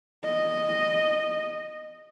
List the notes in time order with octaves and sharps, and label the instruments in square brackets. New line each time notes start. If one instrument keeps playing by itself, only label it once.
[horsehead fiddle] D#5